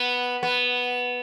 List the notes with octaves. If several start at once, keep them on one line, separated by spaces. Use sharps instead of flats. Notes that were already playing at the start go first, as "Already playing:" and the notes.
Already playing: B3
B3